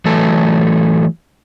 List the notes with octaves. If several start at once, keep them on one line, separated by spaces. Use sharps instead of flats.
E3 F#3 A3 A4